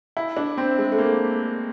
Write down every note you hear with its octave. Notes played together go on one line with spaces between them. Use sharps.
E4
D4
C4
G#3
A3
A#3